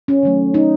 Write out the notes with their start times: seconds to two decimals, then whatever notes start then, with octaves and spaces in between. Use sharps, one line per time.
0.08 C#4
0.23 D#3 F#3 A3
0.54 D#4